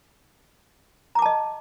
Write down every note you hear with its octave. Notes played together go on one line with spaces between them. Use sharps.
D#5 A5 A#5 D6